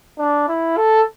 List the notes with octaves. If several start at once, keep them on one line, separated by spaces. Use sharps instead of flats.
D4
E4
A4